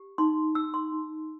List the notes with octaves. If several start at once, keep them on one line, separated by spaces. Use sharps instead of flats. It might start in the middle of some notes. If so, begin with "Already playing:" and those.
Already playing: G4
D#4 C6
D#4 E6
C6
D#4